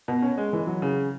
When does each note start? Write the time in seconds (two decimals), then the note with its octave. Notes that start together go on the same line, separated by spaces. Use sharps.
0.08 B2
0.22 C#4
0.38 G#3
0.53 E3
0.67 F#3
0.82 C#3